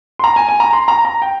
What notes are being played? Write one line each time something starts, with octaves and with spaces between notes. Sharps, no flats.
C6
A#5
G#5
G#5
A#5
C6
A#5
A#5
G5